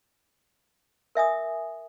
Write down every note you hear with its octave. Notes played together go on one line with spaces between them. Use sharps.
A#4 E5 G#5 D#6